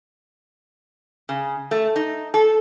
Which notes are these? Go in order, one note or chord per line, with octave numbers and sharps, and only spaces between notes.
C#3
A3
D#4
A4